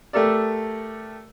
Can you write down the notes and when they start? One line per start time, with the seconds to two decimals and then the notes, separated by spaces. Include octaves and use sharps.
0.13 A3 G4 A4 A#4 D5